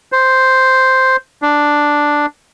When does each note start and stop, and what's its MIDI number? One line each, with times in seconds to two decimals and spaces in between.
0.12 1.16 72
1.42 2.26 62